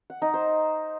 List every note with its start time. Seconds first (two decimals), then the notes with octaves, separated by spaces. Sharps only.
0.10 F#5
0.22 D#4
0.34 C5